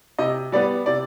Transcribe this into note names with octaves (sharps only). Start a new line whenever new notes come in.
C3 D#5
G3 B3 D5
C3 D5